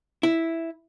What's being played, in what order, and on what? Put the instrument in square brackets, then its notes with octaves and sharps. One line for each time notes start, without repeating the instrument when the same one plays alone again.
[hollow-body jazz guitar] E4